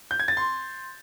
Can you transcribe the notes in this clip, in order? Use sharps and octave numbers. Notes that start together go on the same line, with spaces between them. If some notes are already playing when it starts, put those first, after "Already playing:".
G6
G#6
A6
C6